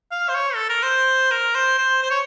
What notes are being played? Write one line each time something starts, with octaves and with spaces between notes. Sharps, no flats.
F5
C5
C#5
A4
A#4
C5
A#4
C5
C5
C5
C#5